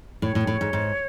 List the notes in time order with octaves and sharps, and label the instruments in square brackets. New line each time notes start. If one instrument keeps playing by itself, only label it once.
[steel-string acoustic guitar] A2 [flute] C#5
[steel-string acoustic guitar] A2
A2
G#2
G#2